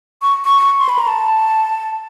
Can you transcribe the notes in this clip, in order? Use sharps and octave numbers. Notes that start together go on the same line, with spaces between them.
C#6
C#6
C6
B5
A#5
A5